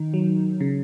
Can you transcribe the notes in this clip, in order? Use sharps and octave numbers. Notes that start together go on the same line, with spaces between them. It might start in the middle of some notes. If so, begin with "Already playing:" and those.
Already playing: D#3 D#4
F#3
C#3